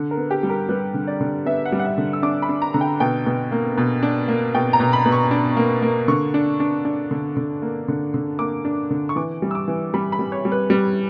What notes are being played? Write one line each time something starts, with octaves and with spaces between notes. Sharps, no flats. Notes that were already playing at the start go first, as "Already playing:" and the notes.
Already playing: D3
A#4
B3
G4
G3
A#4
G3 B4
D3
D5
D3
B3 E5
F#5
G3
F#5
E5
D3
E6
D4 D6
B5
D4
A#5
D3 A#5
G5
B2 G5
B2
A#3
B2
D4
A#3
B2 G5
A#5
B2
B5
B2
C#6
D4
A#3
A#3
D3 C#6
D4
D4
D4
D3
D3
A#3
D3
D3
A#3 D6
D4
D3
C#6
E3 D6
G3
E6
D6
E3
G3 B5
B5
G3
C#5
G3
B4
G3